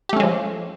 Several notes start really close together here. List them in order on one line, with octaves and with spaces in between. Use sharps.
G4 A3 C#4 G#3 F3